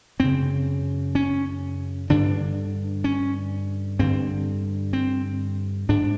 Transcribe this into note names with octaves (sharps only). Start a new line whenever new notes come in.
F#2 C#3 C4
C#4
G2 D3 D4
C#4
G2 D3 C4
C4
G#2 D4